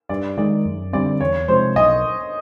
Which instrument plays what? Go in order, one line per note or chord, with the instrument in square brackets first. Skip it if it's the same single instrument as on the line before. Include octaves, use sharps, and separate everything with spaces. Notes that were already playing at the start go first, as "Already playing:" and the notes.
[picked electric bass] G2 [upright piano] D5
[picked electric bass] D#3 G#3 [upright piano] D5
[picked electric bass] F#2
[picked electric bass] D3 G3 C4 [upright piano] D5
[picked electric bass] E2 [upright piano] C#5
[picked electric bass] C3 F3 G#3 [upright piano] C5
[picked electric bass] B1 [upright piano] D#5